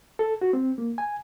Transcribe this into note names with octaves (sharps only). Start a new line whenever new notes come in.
A4
F#4
C4
A#3
G#5